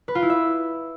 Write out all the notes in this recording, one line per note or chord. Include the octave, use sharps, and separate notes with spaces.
B4
F4
E4
E5